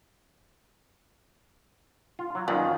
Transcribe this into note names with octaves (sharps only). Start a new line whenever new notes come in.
F4
F#3
F#2 D#3 F4 B4 D5